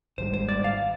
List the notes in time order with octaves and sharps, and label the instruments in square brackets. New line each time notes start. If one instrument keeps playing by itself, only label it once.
[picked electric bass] G#1 G#2 G3 [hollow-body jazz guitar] C5
[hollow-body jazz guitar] C5
D5
F5